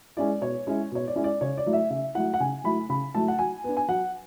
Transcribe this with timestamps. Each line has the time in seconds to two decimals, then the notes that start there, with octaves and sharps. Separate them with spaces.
0.17 G#3 C#4 E4 D5
0.41 B2 C#5
0.67 G#3 C#4 E4
0.91 B2 C#5
1.07 D5
1.16 G#3 C#4 E4
1.24 D5
1.41 C#3 C#5
1.58 D5
1.66 F#3 A3 E4
1.73 E5
1.90 C#3 E5
2.15 F#3 A3 E4 F#5
2.34 F#5
2.40 C#3 G#5
2.64 F#3 A3 E4 B5
2.89 C#3 B5
3.14 F#3 A3 E4 A5
3.28 F#5
3.39 F#3 G#5
3.64 B3 D4
3.77 G#5
3.88 F#3 F#5